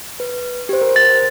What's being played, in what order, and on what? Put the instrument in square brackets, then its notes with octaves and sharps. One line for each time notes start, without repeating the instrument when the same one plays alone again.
[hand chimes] B4
G4 C5
A#4 C5
[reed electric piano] A6